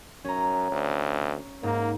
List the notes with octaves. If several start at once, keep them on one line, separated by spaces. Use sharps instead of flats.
F#2 C#4 A#5
D2
G#2 A#3